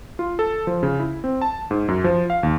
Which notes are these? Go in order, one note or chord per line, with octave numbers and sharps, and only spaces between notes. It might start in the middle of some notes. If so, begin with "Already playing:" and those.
F4
A4
F3
C#3
E4
C4
A5
G#2
F#2
F3
F5
D#2